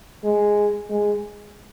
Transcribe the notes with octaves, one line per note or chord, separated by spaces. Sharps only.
G#3
G#3